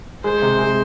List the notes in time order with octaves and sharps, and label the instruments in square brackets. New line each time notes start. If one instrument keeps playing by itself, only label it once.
[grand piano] G#3 [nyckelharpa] C5
[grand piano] C3
G#3